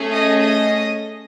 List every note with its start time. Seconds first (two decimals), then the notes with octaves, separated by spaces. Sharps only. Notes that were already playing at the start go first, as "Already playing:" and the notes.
Already playing: A3 C#4 G#4
0.12 D#5 D#6
0.40 D#5 D#6